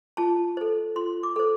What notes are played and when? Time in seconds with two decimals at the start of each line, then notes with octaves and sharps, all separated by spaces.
0.17 F4 A5
0.57 A4 C5
0.96 F4 C6
1.23 D6
1.36 A4 C5